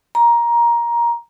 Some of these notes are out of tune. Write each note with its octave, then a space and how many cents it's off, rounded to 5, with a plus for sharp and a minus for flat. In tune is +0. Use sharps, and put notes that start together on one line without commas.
A#5 +15